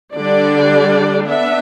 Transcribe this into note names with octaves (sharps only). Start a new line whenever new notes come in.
D3 G3 D4 D5
B3 D4 E5